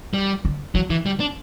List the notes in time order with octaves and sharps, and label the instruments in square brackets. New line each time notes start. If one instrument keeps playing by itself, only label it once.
[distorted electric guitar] G3
[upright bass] D3
[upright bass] E3 [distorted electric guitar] F#3
[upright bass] D3 [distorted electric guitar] E3
[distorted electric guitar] G3
D4